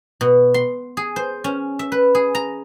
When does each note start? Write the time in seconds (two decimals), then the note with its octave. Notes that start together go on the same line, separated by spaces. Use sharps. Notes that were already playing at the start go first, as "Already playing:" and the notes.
0.21 B2
0.54 C6
0.97 G#4
1.16 C5
1.44 C#4
1.79 E5
1.92 B4
2.15 G#4
2.35 A#5